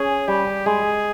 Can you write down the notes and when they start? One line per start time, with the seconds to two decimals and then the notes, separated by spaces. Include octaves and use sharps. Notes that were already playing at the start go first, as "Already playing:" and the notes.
Already playing: C#4 G#4
0.28 G3 G4
0.66 G#3 G#4